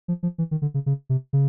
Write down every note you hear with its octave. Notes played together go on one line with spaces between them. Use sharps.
F3
F3
E3
D#3
D3
C#3
C#3
C3
C#3